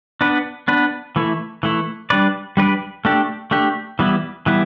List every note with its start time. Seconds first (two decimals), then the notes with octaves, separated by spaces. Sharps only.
0.21 B3 D4 B4
0.68 B3 D4 B4
1.16 E3 A3 E4
1.63 E3 A3 E4
2.10 G3 D4 B4 D5
2.57 G3 D4 B4 D5
3.05 A3 D4 G4
3.51 A3 D4 G4
3.99 E3 G3 B3 E4
4.46 E3 G3 B3 E4